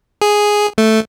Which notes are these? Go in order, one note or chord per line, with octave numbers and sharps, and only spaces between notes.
G#4
A3